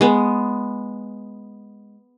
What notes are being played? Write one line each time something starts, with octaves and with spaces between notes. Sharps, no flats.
G#3 B3